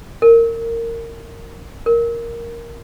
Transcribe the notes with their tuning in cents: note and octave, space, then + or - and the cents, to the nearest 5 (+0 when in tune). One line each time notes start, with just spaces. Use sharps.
A#4 -20
A#4 +0